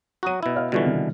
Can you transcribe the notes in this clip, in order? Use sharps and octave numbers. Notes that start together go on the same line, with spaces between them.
F#3 F#4 A#5 D#6 D#7
B2 E4
D#5 F5 F6
B2 D3 E3 G3 F4 C#6
C3 D#3 G3